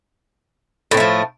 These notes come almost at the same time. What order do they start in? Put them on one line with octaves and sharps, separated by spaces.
A2 C4 A3 F3